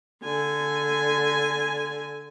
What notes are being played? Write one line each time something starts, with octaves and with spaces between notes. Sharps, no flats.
D3 G#5